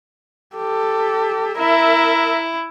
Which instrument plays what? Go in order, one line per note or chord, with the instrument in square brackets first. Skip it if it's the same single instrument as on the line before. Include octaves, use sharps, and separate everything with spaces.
[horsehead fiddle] G4 A4
[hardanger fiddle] E4 [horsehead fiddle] A#4 E5